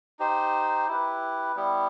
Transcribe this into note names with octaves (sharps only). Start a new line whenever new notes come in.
D#4 G4 C5
E4 G4 B4
G3 B3 E4 G4